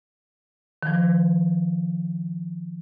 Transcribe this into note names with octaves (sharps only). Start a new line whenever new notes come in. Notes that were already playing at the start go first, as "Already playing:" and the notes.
D#3 F3